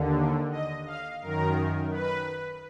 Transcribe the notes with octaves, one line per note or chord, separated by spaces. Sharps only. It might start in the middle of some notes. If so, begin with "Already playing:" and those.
Already playing: D#2 D3
D#5
F5
F#2 D#3 A#4
B4